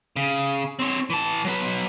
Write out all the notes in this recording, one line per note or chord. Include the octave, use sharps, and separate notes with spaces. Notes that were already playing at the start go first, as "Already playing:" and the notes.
C#3
C4 C#5
E3 A5
F#3 B4